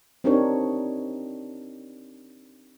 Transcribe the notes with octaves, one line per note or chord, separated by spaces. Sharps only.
C4 D4 D#4 G4 A#4 C#5